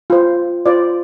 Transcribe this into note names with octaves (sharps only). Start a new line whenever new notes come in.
F4 C5
F4 C5 D5